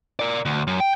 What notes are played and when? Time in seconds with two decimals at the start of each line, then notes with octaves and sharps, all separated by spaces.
0.19 A#4 D5
0.45 D2
0.67 F#2
0.80 G5